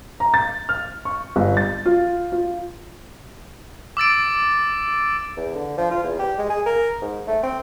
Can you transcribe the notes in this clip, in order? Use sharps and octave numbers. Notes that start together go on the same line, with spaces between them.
A#5
A6
F6
C#6
G1
A6
F4
F4
D6 E6 A6 D7
E2
D3
F3
F4
E2
G4
G#3
G#4
A#4
G#2
A3
C4